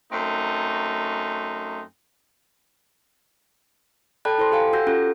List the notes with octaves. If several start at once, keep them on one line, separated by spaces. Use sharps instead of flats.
F#2 A3 C4 D#4
A4 D5 G5 A5 B5 F#6
E4 A4 C5 C6
G4 A4 F5 G5 G#5
F#4 F#5 E6 G6 A#6
C#4 F4 G4 A4